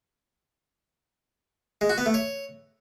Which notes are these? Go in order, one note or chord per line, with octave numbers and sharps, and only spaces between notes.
G#3
F#4
B3
A3
C#5